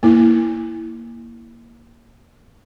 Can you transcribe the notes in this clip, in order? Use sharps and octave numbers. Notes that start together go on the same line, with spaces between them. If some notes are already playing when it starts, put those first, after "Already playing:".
A#3 E4